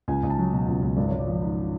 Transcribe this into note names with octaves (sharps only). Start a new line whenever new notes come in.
C#2 G#5
C#2
A5
F#3
B2
C#2
C#2
G#1 D5
G#1 C#5
D5
F3
G#2